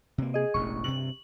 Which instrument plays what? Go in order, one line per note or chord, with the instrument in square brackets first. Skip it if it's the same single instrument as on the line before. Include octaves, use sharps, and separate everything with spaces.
[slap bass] C3 A#3
[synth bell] G#4 D#5
[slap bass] E1 A1 [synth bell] C#6
[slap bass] G2 C3 [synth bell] F#7